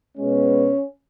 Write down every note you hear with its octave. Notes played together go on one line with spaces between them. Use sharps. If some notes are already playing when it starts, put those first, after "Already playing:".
B2 G#3 B3 C#4